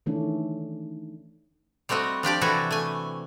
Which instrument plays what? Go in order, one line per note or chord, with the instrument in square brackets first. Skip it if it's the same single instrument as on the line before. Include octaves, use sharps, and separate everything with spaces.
[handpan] D#3 E3 A3 C#4 D4
[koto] G3 A3 C4 F#4 D#5
F3 D4 G4 D5
C3 E3 E4 F#4 A4 G#5
A3 G#5